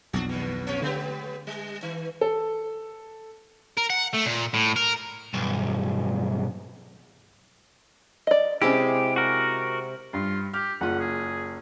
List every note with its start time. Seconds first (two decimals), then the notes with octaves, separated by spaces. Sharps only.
0.13 B1 F2 D4 F#4
0.29 D#2 B2
0.67 C3 F3 C#5
0.82 D3 G#3 B3 G4
1.47 G3
1.82 D#3
2.21 A4
3.77 A#4
3.90 F#5
4.14 A3
4.26 A#2
4.54 A2
4.76 A#4
5.34 B1 G2
8.27 D5 D#5
8.62 C3 G#3 C#4 E4 G4 G#4
9.16 F#4 A#4
10.13 G2 F4
10.53 G4 F6
10.81 F#1 F4 F#5
11.00 G#4